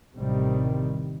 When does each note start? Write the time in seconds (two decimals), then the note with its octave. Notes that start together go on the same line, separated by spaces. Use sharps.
0.18 A1 C3 D#3 G3